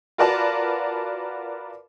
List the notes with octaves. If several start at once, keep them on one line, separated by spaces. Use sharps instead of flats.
F4 F#4 A#4 B4 D5 A5